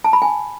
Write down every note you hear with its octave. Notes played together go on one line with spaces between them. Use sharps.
A5
B5
G#5